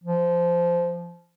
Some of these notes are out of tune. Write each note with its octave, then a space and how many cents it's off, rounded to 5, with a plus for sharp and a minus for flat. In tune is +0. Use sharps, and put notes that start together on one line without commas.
F3 -15